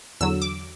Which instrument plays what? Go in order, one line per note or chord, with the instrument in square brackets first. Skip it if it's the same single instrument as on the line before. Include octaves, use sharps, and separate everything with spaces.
[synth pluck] E2 D3 F#3 E6
D6